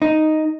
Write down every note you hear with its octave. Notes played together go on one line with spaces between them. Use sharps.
D#4